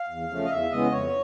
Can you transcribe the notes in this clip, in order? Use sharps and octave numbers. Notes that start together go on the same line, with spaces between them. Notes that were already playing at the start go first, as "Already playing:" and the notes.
Already playing: F5
E2
C#3 F3 A3
D#5
E2 E5
C#3 E3 G#3 B3 D#5
F2 C#5